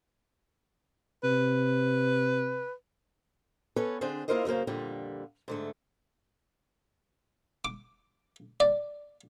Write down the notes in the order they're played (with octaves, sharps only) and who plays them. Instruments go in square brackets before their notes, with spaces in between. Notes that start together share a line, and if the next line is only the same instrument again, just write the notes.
[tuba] C3 [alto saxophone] B4
[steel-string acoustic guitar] B3 C#4 A4 B4 C#5
D3 C4 D4 G#4 C5
A#3 E4 F4 A#4 C5 D#5
F#2 C#3 E3 A#3 C5
F2 A#2 D3 G3
G#2 D3 A3
[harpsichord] D6
D5